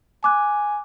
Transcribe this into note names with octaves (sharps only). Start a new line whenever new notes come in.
G#5 D6 F#6